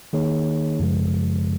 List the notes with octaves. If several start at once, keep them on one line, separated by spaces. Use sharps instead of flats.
D#3 A#3 D#4 G#4 C#5
F#2 C#3 F3 G#3